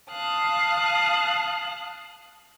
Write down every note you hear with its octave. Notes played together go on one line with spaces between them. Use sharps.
F5 A5 D#6 F#6